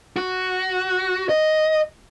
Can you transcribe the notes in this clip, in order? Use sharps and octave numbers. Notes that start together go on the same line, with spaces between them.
F#4
D#5